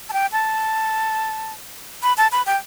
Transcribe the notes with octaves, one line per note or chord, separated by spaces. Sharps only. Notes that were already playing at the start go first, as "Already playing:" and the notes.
A5
G5
A5
B5
A5
B5
G5